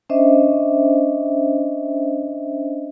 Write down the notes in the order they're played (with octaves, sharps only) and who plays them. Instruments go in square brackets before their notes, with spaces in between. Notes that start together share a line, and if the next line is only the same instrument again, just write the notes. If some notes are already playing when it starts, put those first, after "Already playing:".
[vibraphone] C#4 D4 C5 D#5 E5